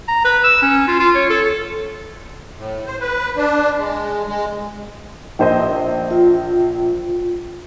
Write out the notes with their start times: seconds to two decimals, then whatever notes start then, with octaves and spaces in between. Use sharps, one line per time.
0.08 A#5
0.24 B4
0.44 E6
0.62 C#4
0.88 F4
1.00 F4
1.15 C#5
1.30 A4
2.56 A2
2.86 C5
3.00 B4
3.37 D4
3.77 G#3
4.27 G#3
5.39 A#1 C5 D#5
6.11 F4